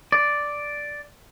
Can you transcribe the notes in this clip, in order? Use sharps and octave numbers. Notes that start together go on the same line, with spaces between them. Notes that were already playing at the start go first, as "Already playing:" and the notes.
D5